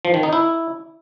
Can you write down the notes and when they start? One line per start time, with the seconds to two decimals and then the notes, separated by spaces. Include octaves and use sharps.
0.05 F3
0.14 D#3
0.23 D#4
0.33 E4